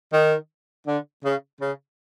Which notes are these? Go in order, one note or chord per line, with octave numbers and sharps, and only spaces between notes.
D#3
D3
C#3
C#3